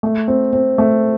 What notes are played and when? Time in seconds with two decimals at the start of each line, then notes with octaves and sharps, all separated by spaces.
0.03 A3
0.28 C4
0.53 C4
0.78 A3